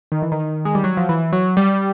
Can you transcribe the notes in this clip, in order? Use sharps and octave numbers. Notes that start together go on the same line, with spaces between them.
D#3
E3
D#3
G#3
G3
F#3
F3
E3
F#3
G3